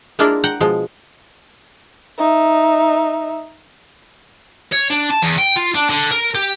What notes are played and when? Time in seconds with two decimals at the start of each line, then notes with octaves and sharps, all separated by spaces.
0.19 G#3 A#3 D4 E4 F4 A#4
0.44 F#5 G5 A#5
0.61 B2 F3 G#3
2.18 D#4 E5
4.72 C#5
4.90 D4
5.10 A5
5.22 E2
5.38 G5
5.56 F4
5.75 D4
5.90 D3
6.12 A#4
6.35 G4